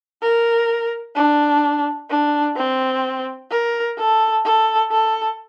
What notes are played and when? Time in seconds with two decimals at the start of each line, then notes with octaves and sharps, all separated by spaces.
0.22 A#4
1.16 D4
2.10 D4
2.56 C4
3.50 A#4
3.98 A4
4.45 A4
4.91 A4